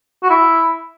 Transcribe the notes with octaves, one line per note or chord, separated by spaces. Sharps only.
F#4
E4